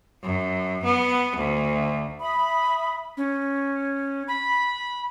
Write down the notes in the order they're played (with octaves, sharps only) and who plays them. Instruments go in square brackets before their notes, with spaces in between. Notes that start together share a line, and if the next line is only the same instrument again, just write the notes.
[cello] F#2
B3
D2
[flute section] E5 B5 D#6
[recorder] C#4
B5